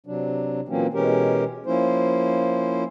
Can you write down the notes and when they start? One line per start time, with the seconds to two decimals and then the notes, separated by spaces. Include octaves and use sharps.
0.06 C3 F#3 D4
0.69 A#2 E3 F#3 A#3 C4 C#4
0.94 B2 E3 G#3 C#4 G4 A#4
1.66 F3 A#3 C#4 E4 C5